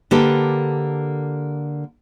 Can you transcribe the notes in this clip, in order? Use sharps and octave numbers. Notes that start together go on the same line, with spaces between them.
D3 A#3 G4 A4 B4